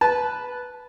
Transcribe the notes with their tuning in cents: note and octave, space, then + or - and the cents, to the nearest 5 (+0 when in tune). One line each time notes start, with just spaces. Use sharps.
B4 -5 A5 -15